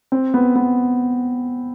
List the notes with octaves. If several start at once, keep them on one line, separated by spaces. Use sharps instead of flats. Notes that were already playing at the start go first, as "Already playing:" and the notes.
C4
B3
B3